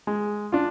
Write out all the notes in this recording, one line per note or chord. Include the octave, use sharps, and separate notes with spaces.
G#3
D4 F4